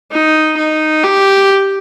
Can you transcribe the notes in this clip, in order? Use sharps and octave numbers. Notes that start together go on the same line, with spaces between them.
D#4
D#4
G4